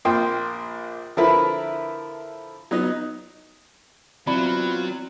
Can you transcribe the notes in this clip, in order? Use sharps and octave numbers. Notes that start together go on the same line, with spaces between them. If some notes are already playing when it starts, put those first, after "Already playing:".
A#1 A#3 G5 C6
D3 F3 E4 A#4 B4
F#3 B3 D#4
F#3 B3 C4 E4 F4 D5 B5